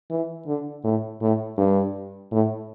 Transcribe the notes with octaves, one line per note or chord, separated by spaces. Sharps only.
E3
D3
A2
A2
G2
A2